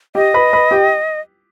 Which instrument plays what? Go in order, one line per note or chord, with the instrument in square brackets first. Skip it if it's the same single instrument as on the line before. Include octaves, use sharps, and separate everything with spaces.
[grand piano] G4 G5 [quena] D#5
[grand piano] B4 B5
B4 B5
G4 G5